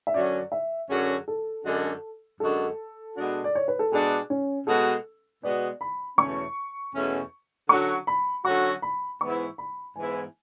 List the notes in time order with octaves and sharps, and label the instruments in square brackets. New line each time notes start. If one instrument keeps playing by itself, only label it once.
[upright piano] E5
[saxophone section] F#2 D3 F#3 C#4 F#4 [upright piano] D5
[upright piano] E5
[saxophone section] F#2 D3 F#3 C#4 F#4 [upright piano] G#4
[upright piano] A4
[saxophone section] F#2 D3 G#3 D4 F#4
[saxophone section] F#2 D3 G#3 D4 F#4 [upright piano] A4
[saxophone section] B2 G#3 D4 F#4
[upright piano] D5
C#5
B4
A4
[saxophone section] B2 G#3 D4 F#4 [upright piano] G#4
[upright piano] C#4
[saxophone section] B2 G#3 B3 F#4 [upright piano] A4
[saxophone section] B2 G#3 B3 F#4 [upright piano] D5
[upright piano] B5
[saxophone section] E2 B2 A3 C#4 [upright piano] C#6
[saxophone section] E2 B2 A3 C#4
[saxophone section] D3 F#3 C#4 F#4 [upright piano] C#6
[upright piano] B5
[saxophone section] D3 F#3 C#4 F#4 [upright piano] C#6
[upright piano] B5
[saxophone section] G#2 E3 B3 E4 [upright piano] C#6
[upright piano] B5
[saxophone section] G#2 E3 B3 E4 [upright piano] G#5